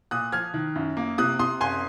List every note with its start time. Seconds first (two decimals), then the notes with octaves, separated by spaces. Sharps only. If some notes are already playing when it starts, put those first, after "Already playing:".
0.11 A#2 D#6 F#6
0.32 F3 F6 G#6
0.54 D#3
0.76 F#2
0.97 A#3
1.18 C3 D#6 F#6
1.39 C3 C6 D#6
1.61 F#1 G#5 C6